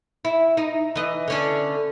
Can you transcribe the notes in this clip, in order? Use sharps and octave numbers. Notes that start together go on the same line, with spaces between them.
E4
D#4
E3 D#5
D3 C#4 D4